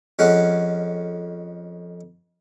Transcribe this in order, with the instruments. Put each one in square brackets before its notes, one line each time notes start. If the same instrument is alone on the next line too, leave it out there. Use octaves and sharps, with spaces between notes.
[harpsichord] F2 G#3 C#4 F#5